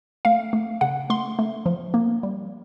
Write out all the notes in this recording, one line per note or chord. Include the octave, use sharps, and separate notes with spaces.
A3 F5
A3
C#3 F#5
A3 C6
A3
F3
A#3
G3